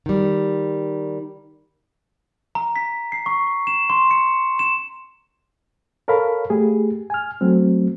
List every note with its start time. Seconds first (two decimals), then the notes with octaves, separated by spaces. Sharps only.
0.06 D#3 G3
2.55 A#5
2.76 B6
3.12 C7
3.26 C#6
3.67 E7
3.90 C6
4.11 C#7
4.59 E7
6.08 A4 A#4 C#5 F5 B5
6.50 A3 G4 G#4
7.10 G#5 F6
7.41 F#3 A3 C4